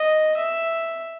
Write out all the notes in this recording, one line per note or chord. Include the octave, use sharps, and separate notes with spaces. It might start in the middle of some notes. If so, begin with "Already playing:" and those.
Already playing: D#5
E5